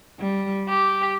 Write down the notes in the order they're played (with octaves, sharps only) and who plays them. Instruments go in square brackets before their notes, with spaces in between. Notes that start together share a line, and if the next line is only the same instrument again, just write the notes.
[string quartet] G3
G4